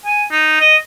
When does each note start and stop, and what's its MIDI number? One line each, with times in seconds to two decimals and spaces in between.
0.06 0.23 80
0.31 0.58 63
0.60 0.76 75